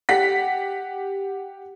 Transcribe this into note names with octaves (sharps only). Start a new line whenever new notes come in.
G4 F#5 B6